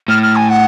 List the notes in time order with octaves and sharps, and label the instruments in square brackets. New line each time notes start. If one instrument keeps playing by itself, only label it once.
[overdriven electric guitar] A2 [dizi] F6
[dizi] F6
G#5
F#5